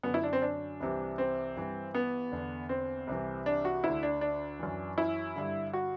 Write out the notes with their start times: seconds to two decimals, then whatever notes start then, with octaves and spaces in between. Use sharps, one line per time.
0.03 F#2 D3 B3
0.14 E4
0.24 D4
0.33 C4
0.42 D4
0.80 C2 C3 E3
1.18 C4
1.56 G2 E3
1.94 B3
2.32 E2 D3
2.69 C4
3.07 C2 C3 E3
3.46 D4
3.65 F#4
3.84 D2 D3 E4
4.03 D4
4.21 D4
4.59 F#2 E3
4.98 E4
5.36 G2 D3
5.73 F#4